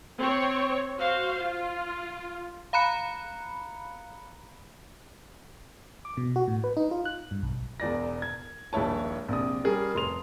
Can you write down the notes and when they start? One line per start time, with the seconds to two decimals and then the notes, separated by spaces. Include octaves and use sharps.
0.18 C4 C#5
0.98 F#4 C5 F5
1.40 F4
2.73 F5 A#5 B5 F#6 C#7
6.05 D6
6.17 B2
6.36 F#4
6.48 A2
6.64 B4
6.77 D#4
6.91 F4
7.05 F#6
7.31 G2
7.43 B1
7.80 E1 E2 D5 A#6
8.22 G#6
8.73 D#1 A#1 G#3 E4 C#5 A5
9.28 A#1 C3 D5 D#6
9.64 G3 C#4 G#4 A#4
9.94 F1 C6 F7